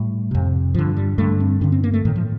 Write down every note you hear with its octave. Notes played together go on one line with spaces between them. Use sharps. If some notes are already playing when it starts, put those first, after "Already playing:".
Already playing: A2 G3
F2 C3
G2 D3 F3
G3
G2 D3 A3
C4
G2 D3 D4
C4
A#3
A3
A2 D#3
F3